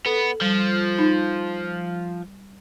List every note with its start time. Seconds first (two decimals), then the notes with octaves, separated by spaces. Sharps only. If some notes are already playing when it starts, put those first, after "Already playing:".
0.06 B3 A4
0.41 F3 G3
0.99 D#4